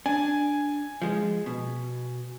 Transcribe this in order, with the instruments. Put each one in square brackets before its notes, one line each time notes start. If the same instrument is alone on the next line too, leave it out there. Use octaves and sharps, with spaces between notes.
[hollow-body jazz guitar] D4 [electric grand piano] G#5
[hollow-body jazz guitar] F3 G#3
B2